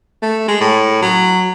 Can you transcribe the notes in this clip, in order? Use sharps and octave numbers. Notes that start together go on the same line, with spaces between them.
A3
G#3
A2
F#3